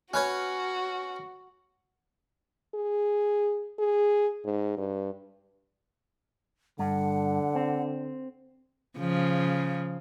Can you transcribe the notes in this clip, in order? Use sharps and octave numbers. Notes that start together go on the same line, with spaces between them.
C#4 F#4 B4 C#5
G#4
G#4
G#2
G2
G2 D3 F#5
C4
C#3 F3